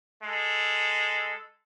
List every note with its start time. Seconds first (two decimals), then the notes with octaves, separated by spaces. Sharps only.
0.23 G#3 A4